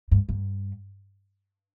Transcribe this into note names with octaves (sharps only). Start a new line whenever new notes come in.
G2
G2